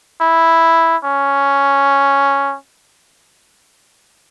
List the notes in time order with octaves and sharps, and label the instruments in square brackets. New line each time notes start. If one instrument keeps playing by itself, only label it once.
[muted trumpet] E4
C#4